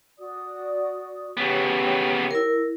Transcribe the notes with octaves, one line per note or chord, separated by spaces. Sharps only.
F#4 D5 D#6
C#3 B3 G4 C#5
E4 A#4